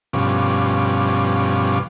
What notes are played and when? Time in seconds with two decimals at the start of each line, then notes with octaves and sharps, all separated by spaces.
0.13 G2 B2 F3 C#4 D6